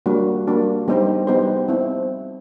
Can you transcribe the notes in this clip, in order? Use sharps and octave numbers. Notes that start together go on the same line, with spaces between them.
G3 A#3 D4 F#4
G3 A#3 D4 F#4
G3 B3 D#4 G4 C5
G3 B3 D#4 G4 C5
C4 E4